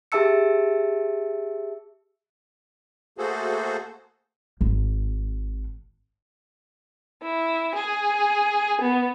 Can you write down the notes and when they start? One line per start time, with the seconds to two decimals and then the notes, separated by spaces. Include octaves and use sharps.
0.12 G4 G#4 E5 A5 E6 C#7
3.18 A3 A#3 F#4 G#4 A4 C5
4.61 G#1
7.22 E4
7.75 G#4
8.82 B3